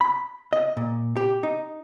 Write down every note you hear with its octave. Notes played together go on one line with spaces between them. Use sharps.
B5
D#5
A#2
G4
D#4